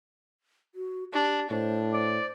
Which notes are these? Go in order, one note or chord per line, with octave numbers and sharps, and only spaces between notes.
F#4
D4 G4
A2 D4 C5
C5 D5